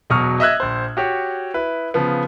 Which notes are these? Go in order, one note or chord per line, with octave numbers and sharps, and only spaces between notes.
E1 B2 F#3 C#6 D#6 F6
D#5 E5 E6 F#6 G#6
A#1 C5
F#4 G4 C#5
E4 B4
C#3 F3 B3